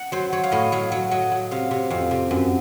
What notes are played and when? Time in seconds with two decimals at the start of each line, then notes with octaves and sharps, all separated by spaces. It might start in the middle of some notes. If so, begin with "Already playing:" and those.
Already playing: F#5
0.12 F#3 C5
0.32 F#3 C#5
0.44 F5
0.52 A2 D#5
0.72 F#3 F5
0.92 F#3
1.11 F#3 D#5
1.31 F#3
1.51 C3 F5
1.71 C3
1.90 F2 F5
2.11 C3
2.31 F#2